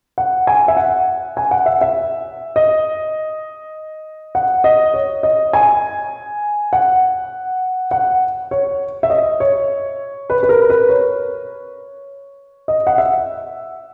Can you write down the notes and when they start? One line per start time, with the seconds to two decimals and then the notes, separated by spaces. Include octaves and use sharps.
0.18 F#5
0.47 G#5
0.68 E5
0.77 F#5
1.37 G#5
1.51 F#5
1.66 E5
1.81 E5
2.56 D#5
4.35 F#5
4.64 D#5
4.94 C#5
5.23 D#5
5.53 G#5
6.73 F#5
7.91 F#5
8.51 C#5
9.03 E5
9.10 D#5
9.40 C#5
10.30 B4
10.43 B4
10.49 A#4
10.70 B4
10.89 C#5
12.68 D#5
12.87 F#5
12.98 E5